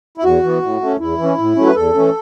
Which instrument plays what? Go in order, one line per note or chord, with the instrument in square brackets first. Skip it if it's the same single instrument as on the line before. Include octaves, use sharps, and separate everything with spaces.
[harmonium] E4
E2 F#4
E3 B3
A2
A3 C#4
E2 E4
E3
C#4
A2
F#3 A3 C#4
B4
E2 A4
E3 A3 C#4